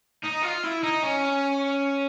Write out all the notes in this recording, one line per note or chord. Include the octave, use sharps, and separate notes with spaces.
D#4
F4
E4
D#4
C#4